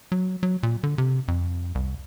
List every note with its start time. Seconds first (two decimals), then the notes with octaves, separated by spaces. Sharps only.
0.12 F#3
0.43 F#3
0.63 A#2
0.83 D3
0.98 C3
1.28 F2
1.75 C2